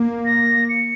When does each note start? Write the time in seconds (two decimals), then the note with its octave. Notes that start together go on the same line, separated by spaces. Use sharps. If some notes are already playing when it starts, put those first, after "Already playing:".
Already playing: A#3
0.25 A#6
0.69 C#7